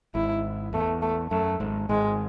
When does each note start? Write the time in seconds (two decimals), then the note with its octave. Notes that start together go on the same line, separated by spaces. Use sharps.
0.15 G#1 G#2 E4
0.73 E2 A3
1.02 A3
1.31 F#2 A3
1.60 G#1 G#2
1.89 G#1 G#2 G#3